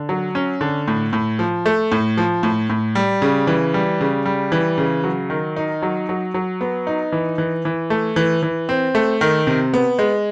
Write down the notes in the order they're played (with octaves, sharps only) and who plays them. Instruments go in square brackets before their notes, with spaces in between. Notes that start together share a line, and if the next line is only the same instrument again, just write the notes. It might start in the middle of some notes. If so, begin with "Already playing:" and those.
Already playing: [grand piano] D3
F#3
C#4
D3
A2
A2
F3
A3
A2
F3
A2
A2
G3
C#3
E3
G3
C#3
G3
E3
C#3
F#3
D#3
D#4
F#3
F#3
F#3
B3
D#4
E3
E3
E3
A3
E3
E3
C4
A3
D#3
C3
B3
G#3